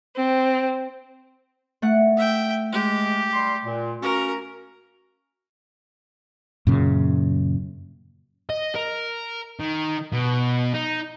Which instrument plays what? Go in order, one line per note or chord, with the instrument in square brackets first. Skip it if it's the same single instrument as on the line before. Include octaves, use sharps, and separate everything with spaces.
[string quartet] C4
[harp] A3 F#5 F#6
[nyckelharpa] E5 G5
[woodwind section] G#3 [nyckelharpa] G4
[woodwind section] G3 C6
A#2
[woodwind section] A#3 C#4 F#4 [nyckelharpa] A#4
[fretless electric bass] F#2 A#2 C#3
[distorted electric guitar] D#5
A#4
D#3
B2
D#4